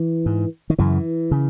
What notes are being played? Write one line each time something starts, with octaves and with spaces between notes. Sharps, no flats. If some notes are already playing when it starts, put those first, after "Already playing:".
Already playing: E3
G#2
D#3
F#2 C#3 E3
C#3